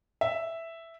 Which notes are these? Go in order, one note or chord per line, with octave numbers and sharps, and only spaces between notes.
E5